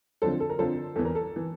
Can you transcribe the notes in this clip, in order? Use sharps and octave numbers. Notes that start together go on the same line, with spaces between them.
F2 D3 F3 A4 C5
A4
A#4
F2 D3 F3 A4 C5
E2 E3 A4
A#4
A4
E3